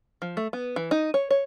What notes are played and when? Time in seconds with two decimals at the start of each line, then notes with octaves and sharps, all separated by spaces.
0.22 F3
0.37 A3
0.53 B3
0.76 E3
0.91 D#4
1.14 C#5
1.30 C#5